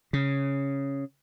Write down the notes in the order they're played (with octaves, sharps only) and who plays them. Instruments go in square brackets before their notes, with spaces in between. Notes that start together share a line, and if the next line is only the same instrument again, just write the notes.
[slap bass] C#3